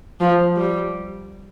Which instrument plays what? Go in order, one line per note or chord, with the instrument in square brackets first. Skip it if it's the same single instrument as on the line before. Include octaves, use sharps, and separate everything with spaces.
[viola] F3
G3